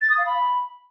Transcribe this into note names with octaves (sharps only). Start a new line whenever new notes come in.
A6
D#6
F5
B5